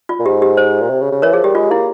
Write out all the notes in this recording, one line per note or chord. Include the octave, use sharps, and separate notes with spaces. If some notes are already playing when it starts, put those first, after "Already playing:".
F4
A#2
G#2 G4
G4
C5
A#2
C3
C#3
C#3
E3 A#4 C#5
F3 G#4
G3 G4
G#3 F4
A#3 E4